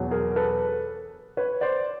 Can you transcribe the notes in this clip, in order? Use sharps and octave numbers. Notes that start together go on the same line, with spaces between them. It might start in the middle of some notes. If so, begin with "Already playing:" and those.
Already playing: E2 B2 F#3
G#4 A#4
A4 B4
B4 C#5
C5 D5